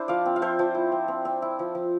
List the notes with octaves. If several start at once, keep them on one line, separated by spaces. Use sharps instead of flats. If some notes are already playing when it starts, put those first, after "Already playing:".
Already playing: D4 E4 C5
F3 D5 F5
C4
F5
F3 C5 E5
F3
E4
C4
C4
C4
E4
F3
F3